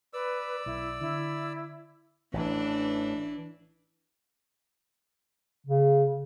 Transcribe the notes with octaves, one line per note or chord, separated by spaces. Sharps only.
B4 D5 E6
B1 E4
D3 E4
A1 E3 D4
C#3